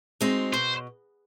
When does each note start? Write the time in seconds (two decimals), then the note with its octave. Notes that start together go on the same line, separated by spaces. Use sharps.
0.21 G#3 C4 D#4 F#4
0.53 B2 C5